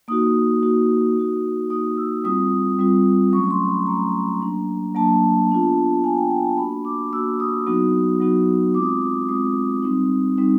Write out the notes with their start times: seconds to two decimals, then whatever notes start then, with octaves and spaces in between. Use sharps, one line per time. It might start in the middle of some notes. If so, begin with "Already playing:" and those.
0.08 A#3 D#4 F#4 D#6
0.63 A#3 D#4 F#4
1.17 A#3 D#4 F#4
1.70 A#3 D#4 F#4 D#6
1.97 E6
2.24 G3 C4 F4 D#6
2.79 G3 C4 F4
3.33 F#3 C#6
3.36 A3 C#4
3.44 C#6
3.51 C6
3.69 B5
3.87 F#3 A3 C#4 A#5
4.41 F#3 A#3 D4
4.95 F#3 A#3 D4 A5
5.50 B3 D4 F4
6.04 B3 D4 F4 G#5
6.18 G5
6.30 G5
6.44 A5
6.58 A#3 D4 F#4 B5
6.85 D6
7.13 A#3 D4 F#4 E6
7.40 D#6
7.67 F#3 B3 D#4 F#4
8.20 F#3 B3 D#4 F#4
8.74 G#3 C4 F4 D6
8.82 D#6
8.89 D6
9.02 D#6
9.29 G#3 C4 F4 D#6
9.83 G3 C4 D#4
10.37 G3 C4 D#4